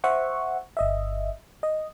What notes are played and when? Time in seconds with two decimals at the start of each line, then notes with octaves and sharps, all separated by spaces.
0.04 C5 E5 F#5 C#6
0.77 G1 D#5 E5
1.63 D#5